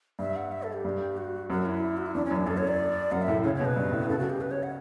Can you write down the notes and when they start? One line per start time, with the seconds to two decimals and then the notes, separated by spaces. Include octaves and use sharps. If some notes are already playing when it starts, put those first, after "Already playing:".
0.19 G2 E5
0.36 F#5
0.52 E5
0.63 A4
0.73 G4
0.85 G2
1.17 F#4
1.50 F#2 F#4
1.66 E4
1.97 F#4
2.06 E4
2.14 E2 D4
2.25 C#4
2.31 F#2
2.36 D4
2.47 F#2 A4
2.58 C#5
2.67 D5
3.12 F#2 F#5
3.22 E5
3.28 A2
3.44 C#3 C#5
3.55 B2 C#5
3.65 B4
3.76 G2
3.92 A2
4.09 C#3 A4
4.19 F#4
4.30 G4
4.41 B4
4.51 C#5
4.63 F#5